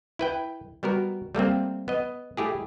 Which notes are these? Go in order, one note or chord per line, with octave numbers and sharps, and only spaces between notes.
E4 B4 G5
G3 B3 F#4 A#4
G3 A3 A#3 C4
B3 D#5
A3 E4 G4 G#4